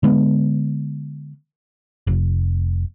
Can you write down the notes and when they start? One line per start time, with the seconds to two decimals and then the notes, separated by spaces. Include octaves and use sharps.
0.03 D3 G#3 B3
2.07 F1